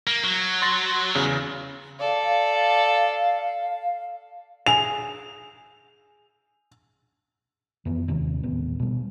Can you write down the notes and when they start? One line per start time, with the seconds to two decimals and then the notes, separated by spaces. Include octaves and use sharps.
0.07 A#3
0.24 F#3
0.62 C6 A6 A#6
1.15 E2 C#3
1.99 A4 D5 F5
4.66 G#4 F7
7.85 F2 E3 F3 B3
8.08 D#2 C3 D#3
8.43 D#1 A1 B3
8.80 B2 G3